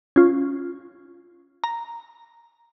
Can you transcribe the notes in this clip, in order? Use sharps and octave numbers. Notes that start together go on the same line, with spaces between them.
C#4 F4
A#5